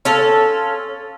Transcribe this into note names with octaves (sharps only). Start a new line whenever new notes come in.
C#4 F4 A4